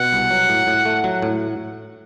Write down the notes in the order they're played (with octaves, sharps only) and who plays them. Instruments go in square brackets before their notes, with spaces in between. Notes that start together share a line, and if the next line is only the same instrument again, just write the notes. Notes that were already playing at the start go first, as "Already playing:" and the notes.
Already playing: [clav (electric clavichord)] B2 [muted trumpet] F#5
[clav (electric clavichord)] C2
F#3
A2
A2
A3
F#3
A2